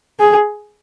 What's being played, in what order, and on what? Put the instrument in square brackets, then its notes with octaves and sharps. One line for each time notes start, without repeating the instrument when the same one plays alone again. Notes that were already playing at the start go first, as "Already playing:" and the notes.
[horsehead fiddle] G#4